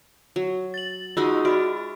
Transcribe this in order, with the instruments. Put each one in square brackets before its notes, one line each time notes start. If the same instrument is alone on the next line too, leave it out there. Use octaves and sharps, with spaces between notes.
[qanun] F#3
[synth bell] A6 F#7
[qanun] G#3 D#4 F#4 [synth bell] F4 E6
[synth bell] F#4 B5 [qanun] D5